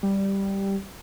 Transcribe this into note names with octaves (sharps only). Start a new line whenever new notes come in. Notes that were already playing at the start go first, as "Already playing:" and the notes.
G3